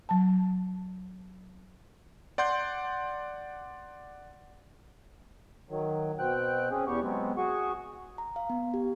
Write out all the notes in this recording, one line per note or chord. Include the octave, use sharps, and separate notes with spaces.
F#3 A5
D5 F#5 C6 G6
D#3 F#3
B2 C4 G5 F#6
C4 C#4 G#4
E2 B3 G4 C#6
F#3 G#3 B3 C4
F#4 G#4 C#6
A#5
F5
B3
G4